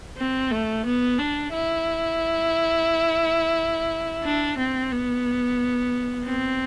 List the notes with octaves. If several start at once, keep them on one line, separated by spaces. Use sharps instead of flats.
C4
A3
B3
D4
E4
D4
C4
B3
C4